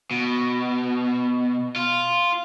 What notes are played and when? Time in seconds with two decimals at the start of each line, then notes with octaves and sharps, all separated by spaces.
0.11 B2
1.76 F4